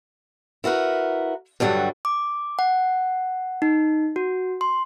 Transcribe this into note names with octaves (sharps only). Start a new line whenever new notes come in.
E4 F#4 A#4 B4
G2 D3 F#3 G3
D6
F#5
D#4
F#4
C6